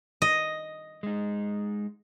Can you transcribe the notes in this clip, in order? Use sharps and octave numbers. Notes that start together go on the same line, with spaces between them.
D#5
G#3 D#4